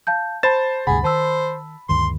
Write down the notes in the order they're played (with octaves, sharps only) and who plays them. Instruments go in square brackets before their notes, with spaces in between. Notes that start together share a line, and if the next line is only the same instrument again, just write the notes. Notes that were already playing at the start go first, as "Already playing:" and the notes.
[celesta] F5 A5 G6
[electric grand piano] C5 A6 [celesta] A5 B5 E7
[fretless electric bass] D2 G2 C3 [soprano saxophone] G#4 [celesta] F#5 [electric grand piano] B5
[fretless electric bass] D#3 [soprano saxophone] C5 [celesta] A5 E6
[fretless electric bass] D2 G2 D#3 [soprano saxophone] C6